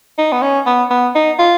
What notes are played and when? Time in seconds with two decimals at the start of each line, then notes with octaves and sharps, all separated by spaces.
0.18 D#4
0.32 B3
0.42 C#4
0.66 B3
0.91 B3
1.15 D#4
1.39 F4